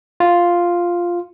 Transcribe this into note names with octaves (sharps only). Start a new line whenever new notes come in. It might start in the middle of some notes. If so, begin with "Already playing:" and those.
F4